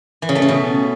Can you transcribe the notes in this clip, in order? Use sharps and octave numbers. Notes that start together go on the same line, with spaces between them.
E3
C#3
A3
C#3
B2